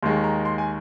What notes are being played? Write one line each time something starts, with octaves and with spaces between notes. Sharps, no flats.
D#2 D#3 G#3 C6
A#5
C6
G#5